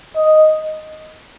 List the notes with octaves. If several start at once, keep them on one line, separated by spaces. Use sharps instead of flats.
D#5